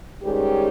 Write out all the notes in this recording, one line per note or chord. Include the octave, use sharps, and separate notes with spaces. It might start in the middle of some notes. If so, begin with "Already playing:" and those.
G#2 D#3 G3 G#3 C#4 G4